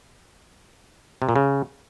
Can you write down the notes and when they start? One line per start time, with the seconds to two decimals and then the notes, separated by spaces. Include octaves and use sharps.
1.22 C3
1.29 A#2
1.36 C#3